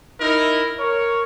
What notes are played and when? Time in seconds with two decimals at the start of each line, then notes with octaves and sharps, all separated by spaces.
0.20 D#4 E4 A#4
0.78 A#4 C#5